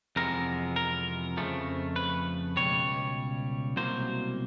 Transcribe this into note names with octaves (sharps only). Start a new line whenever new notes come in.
F2 C3 E3 G#3 B3 A#4
A#4
F2 C#3 F3 A3
B4
C#2 B2 G3 C#5
C2 B2 F#3 A#3 C5